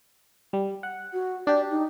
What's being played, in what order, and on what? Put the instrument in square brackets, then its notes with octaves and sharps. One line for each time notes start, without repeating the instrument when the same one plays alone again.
[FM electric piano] G3
F#5
[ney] F#4
[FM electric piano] D4 G4 [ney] D5
[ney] D#4